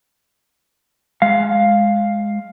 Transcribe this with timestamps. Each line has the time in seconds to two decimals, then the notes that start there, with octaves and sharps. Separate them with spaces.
1.22 G#3 F5